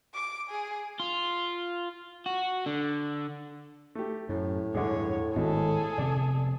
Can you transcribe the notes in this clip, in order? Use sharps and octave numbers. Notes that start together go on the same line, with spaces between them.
D6
G#4
F4
F#4
D3
A3 G4
F#2 A2
E2 G2 D3 G#3 G#4 C#5
G#1 B2 G#4 A4
F1 C3 B3 D5